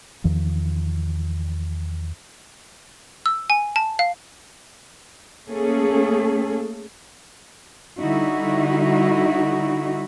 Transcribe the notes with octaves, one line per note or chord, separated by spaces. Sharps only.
E2 D#3 F3
E6
G#5
A5
F5
A3 A#3 C#4 G#4 A4
D3 G3 D#4 E4 F#4